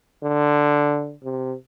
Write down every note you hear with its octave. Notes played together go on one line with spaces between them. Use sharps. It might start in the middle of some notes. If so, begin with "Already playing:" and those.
D3
C3